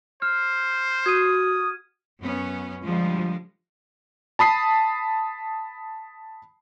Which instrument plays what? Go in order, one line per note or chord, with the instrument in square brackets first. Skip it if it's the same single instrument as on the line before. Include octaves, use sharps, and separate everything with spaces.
[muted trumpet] C5 [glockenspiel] F6
[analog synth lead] F#4 [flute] D#6 [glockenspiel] G#6 D#7
[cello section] F#2 B3 C#4
[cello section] D3 G3 G#3 [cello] F3
[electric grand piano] A5 B5 D#6 C7